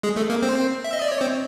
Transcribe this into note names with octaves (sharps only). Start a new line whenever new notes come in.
G#3 G#4
A3 A4
A#3 A#4
C4 C5
E5
D#5
D5
C#5
C4 C5